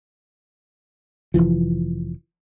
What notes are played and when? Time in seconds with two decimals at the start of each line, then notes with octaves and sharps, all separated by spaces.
1.34 F1 C2 E3 F3